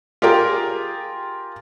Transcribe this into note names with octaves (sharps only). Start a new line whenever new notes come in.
F4 G4 G#4 A#4 G5